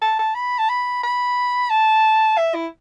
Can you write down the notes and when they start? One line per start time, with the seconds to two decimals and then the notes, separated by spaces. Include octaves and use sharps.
0.02 A5
0.19 A5
0.35 B5
0.59 A5
0.69 B5
1.03 B5
1.70 A5
2.38 E5
2.54 E4